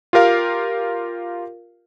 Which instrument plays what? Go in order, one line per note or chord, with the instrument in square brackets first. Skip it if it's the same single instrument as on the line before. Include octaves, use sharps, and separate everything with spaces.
[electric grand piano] F4 G4 A#4 F5